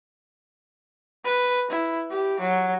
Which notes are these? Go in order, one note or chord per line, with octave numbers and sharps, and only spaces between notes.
B4
E4
G4
F#3